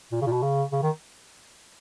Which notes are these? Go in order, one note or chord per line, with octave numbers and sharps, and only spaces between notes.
A#2
C#3
A#2
B2
C#3
C#3
D#3